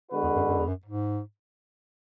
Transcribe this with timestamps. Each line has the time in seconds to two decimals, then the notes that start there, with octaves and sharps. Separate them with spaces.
0.11 D3 G#3 B3 F#4 B4
0.23 E2
0.36 F#2
0.48 F#2
0.58 E2
0.67 F#2
0.86 G#2